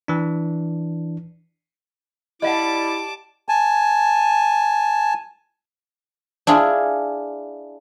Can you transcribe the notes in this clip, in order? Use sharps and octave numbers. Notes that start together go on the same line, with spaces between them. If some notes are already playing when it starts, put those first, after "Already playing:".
E3 D4
G3 E4 D#5 F5 F#5 A5 D6
G#5 A5
D4 E4 F4 G#4